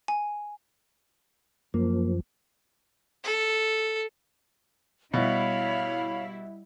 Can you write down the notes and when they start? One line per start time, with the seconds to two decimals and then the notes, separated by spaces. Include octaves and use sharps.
0.08 G#5
1.74 F#2 F3 A#3
3.24 A4
5.14 B2 G3 E4 C#5 F5 B5